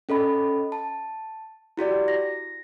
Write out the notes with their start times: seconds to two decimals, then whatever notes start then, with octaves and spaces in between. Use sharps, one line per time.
0.09 C#4 A4 D#5 B5
0.72 A5
1.77 E4 F#4 G4 D5
2.08 A#6